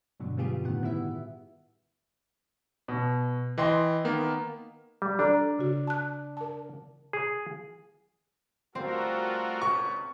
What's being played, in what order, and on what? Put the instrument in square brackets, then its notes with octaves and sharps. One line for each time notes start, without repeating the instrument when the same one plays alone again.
[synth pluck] G2 B2 D3 F#3
G3 B3 F4 G4 G#4
A2 D#3 B3 F#5
B3 E4 E5
[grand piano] B2
[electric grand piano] E3 [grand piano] D#5 G5 C6
[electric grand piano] D#3 A#3 B3
[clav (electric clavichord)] G3
[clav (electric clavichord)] D4 [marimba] A4 D5 A#5
[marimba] C#3 F#4
A5 F#6
A#4 A5
[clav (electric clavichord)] G#4
[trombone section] G3 A3 F4 [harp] C4 [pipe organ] F#4 A4 A#4
[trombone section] C#2 A#2 [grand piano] C#6